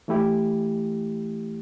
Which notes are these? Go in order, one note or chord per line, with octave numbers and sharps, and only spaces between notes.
E3 A3 E4 G4